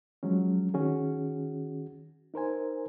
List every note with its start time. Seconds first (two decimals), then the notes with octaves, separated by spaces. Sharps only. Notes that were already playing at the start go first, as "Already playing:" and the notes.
0.23 F3 F#3 G#3 C#4
0.74 D#3 C#4 F#4 G#4
2.34 D#4 A#4 C5 G#5